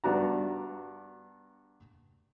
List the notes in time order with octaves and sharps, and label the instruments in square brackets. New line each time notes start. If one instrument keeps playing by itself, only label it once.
[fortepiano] G2 B3 D4 F#4 A#5